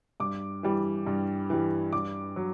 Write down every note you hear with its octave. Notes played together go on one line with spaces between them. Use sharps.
G2 D6
E3 G3
G2
E3 G3
G2 D6
F#3